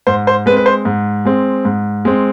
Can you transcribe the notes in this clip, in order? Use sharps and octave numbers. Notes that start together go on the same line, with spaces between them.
G#2 C5
C5
G#3 C4 B4
B4
C5
G#2
G#3 C4
G#2
G#3 C4